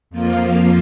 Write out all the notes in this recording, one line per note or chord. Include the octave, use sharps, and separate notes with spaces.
F2 F3 A#3 F4